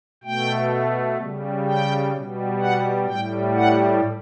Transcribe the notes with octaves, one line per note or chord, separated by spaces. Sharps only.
B2 A3 G5
C#3 G3
G5
B2 G3
F#5
A2 G3 G5
F#5